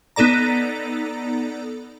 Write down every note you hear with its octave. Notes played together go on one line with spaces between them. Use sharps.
B3 D#4 A4 D5 A#5